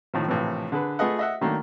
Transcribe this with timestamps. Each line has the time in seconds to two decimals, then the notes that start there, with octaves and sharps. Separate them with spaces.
0.14 A2 D#3 F3
0.28 A#1 A2 C3 E3
0.72 D3 G#4 B4
0.99 A3 F4 G#4 B4 D#5 F#5
1.19 D#5 E5 F#5
1.41 D#3 F#3 A3 A#3 D4